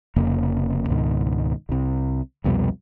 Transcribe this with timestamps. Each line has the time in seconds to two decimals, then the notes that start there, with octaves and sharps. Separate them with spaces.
0.16 F1 F2 C#3 A#3
0.89 C#2 G#2 B2 D#3
1.69 C2 C3
2.44 C2 F2 B2 G3